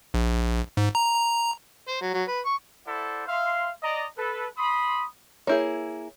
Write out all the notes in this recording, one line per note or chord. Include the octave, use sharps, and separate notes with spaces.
A#1
G#2
A#5
A#5
C5
F#3
F#3
B4
C#6
E4 A4 C5 D5 E5 F#5
E5 F5 C6
D5 D#5 A#5
A4 B4
B5 C6 D#6
A#3 E4 G#4 C#5 G6